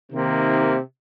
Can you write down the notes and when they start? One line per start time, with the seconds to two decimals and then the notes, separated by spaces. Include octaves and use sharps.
0.11 C3 D#3 A#3